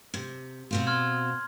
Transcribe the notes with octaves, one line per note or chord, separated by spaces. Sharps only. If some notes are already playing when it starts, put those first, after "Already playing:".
C3
B2 C4 F4
C6 F6 G#6